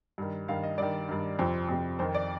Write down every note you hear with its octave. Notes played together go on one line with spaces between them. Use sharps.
G2 D#3
G2 D#3 F5
D#5
G2 D#3 D5
G2 D#3
F2 C3 F3 C5
F2 C3 F3
F2 D#3 C5
D5